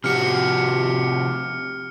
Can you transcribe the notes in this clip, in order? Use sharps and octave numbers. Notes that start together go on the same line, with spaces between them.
C3 F3 F#4 G4 F6 C#7